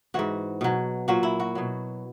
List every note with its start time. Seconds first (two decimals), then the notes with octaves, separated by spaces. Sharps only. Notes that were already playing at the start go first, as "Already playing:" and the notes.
0.14 G#2 E3 F#4
0.61 B2 F#3
1.08 A#2 F#3 F#4
1.23 E4
1.40 F#4
1.55 B2 F#3